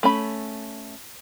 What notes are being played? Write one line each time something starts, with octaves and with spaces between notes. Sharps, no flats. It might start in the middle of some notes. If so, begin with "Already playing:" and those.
A3 C#4 B5